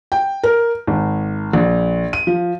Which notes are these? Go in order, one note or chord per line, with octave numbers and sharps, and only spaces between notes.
G5
A#4
G#1
A#1
D#7
F3